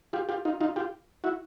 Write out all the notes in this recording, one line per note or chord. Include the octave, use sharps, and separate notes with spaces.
F4 G4
F4 G4
D#4 F4
D#4 F4
F4 G4
E4 F#4